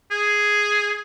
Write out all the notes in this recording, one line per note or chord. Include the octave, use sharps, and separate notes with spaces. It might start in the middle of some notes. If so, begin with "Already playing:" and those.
G#4